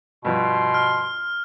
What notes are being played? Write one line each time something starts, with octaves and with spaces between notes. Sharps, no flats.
G2 B2 F3 C6
F6